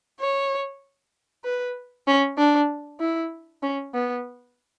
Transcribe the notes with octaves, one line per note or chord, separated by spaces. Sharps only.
C#5
B4
C#4
D4
E4
C#4
B3